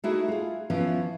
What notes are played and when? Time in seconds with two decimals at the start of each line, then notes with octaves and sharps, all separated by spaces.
0.04 A3 D#4 E4 F#4 G#4
0.28 F4 G#4
0.70 E3 F3 B3 C#4 E4